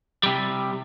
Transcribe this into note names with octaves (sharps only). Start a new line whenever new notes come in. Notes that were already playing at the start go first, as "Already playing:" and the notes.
C3 G3